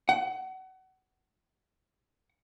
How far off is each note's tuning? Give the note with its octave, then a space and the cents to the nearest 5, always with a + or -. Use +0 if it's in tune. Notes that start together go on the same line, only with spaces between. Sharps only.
F#5 +30